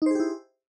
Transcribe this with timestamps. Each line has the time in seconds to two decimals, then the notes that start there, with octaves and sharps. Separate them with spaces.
0.02 D#4
0.06 C5
0.11 G#4
0.15 G4
0.20 E4